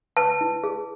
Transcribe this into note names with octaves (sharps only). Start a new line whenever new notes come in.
B4 A5
E4
G#4